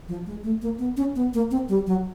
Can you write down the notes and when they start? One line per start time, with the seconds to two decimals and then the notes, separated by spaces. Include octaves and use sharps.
0.08 F3
0.26 G#3
0.44 A3
0.62 A#3
0.79 B3
0.97 C#4
1.15 B3
1.34 A#3
1.51 C4
1.69 G3
1.87 F#3